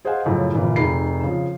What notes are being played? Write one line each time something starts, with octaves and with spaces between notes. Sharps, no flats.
G#4 C5 D#5 F5 F#5 G#5
F#2 A2 C#3 F3
G1 A#2 E3
F1 D#4 G#4 B5 C7
C#3 F3